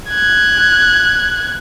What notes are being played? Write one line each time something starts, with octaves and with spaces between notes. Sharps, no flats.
F#6 G#6